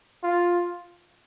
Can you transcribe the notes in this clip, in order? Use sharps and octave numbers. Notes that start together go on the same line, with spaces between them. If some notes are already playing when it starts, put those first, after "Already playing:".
F4